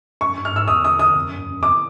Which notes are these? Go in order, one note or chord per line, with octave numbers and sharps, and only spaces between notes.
F#2 C#6
G2
F6
G#2 E6
E2 D#6
D#6
D#6
F2
F#2
F#2
F#2
F2 D6